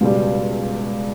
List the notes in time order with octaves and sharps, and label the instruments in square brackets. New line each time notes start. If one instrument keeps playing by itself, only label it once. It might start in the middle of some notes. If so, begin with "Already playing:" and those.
[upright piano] C#2 B2 G3